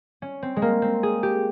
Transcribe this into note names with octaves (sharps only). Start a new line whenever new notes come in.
C#4
C4
G#3
A#3
C4
G#4
G4